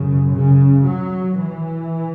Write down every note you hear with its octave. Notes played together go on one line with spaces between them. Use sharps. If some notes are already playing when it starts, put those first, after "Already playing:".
Already playing: F#2 C#3
C#3
F#3
E3